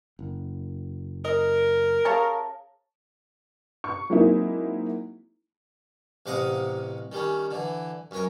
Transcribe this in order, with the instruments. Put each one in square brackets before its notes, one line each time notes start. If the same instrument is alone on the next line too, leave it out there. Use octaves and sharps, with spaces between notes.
[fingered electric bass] F#1
[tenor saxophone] A#4 [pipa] D#5
[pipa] C#4 C#5 A5 [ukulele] G#4 F5 A#5
[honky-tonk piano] C#6
F#3 G#3 A#3 C4 D#4 E4
[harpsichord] A1 C3 F5 F#5 A#5 D#6
D#3 G3 C#4
D3 E3
F#2 C#4 A#4